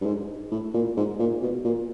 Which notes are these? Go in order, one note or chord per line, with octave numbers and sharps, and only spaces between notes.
G2
G#2
A2
A#2
G#2
A#2
B2
A#2